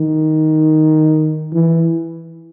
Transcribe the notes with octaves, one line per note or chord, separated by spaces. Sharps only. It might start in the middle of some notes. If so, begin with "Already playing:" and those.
Already playing: D#3
E3